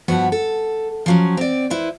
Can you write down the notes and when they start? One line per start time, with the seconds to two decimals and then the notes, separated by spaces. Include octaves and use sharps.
0.08 G2 F3 B3 F#4 F#5
0.32 A4
1.06 F3 F#3 C#4
1.37 C4 D5
1.70 E4 B4 C5